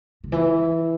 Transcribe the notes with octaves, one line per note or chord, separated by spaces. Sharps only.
C#3
E3